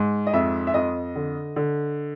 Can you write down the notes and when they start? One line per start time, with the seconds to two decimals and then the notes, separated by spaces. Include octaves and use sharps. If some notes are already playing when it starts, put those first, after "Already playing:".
Already playing: G#2
0.27 D#5
0.33 F2 E5
0.67 E5
0.74 F2 D#5
1.16 D3
1.56 D3